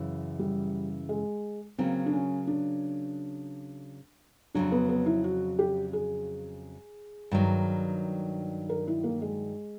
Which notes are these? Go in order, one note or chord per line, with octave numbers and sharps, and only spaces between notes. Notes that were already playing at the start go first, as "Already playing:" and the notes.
Already playing: F#2 C#3 E3
G3
G#3
C#3 F#3 A#3 C4
D4
C#4
D4
F2 C#3 F#3 D4
B3
B3
E4
F#4
G4
G#4
G2 D#3 F#3
A#4
E4
A#3
G#3